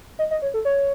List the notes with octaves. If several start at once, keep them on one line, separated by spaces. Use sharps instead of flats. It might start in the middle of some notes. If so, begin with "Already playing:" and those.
D#5
D#5
C#5
A4
C#5